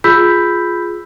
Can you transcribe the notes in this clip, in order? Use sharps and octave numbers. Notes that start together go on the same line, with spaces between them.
F4 G#4 B5 E6 G6 B6